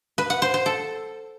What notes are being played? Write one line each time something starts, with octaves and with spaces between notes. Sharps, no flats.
B4
F#5
C5
C5
A4